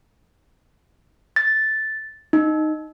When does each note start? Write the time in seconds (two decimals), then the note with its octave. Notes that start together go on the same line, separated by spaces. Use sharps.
1.36 A6
2.33 D#4